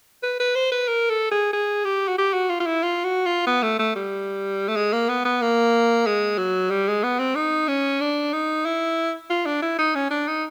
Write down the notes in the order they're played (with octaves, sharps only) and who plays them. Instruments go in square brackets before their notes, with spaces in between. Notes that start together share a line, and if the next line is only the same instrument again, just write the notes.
[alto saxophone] B4
B4
C5
B4
A#4
A4
G#4
G#4
G4
F#4
G4
F#4
F4
F4
E4
F4
F#4
F4
B3
A3
A3
G3
A3
G#3
A#3
B3
B3
A#3
G#3
F#3
G3
G#3
B3
C4
D#4
C#4
D4
D#4
E4
F4
D4
E4
D#4
C#4
D4
D#4